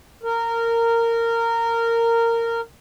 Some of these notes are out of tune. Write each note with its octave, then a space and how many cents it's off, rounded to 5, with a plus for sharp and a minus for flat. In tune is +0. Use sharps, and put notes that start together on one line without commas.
A#4 -15